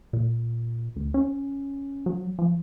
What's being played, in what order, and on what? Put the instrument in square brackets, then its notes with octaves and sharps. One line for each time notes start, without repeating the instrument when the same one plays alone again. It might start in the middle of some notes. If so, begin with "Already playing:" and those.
[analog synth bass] A#2
D2
C#4
F#3
F3